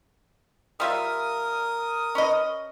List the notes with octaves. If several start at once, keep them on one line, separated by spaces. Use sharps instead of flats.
G3 F4 A#4 E5 D#6
C#4 B4 D#5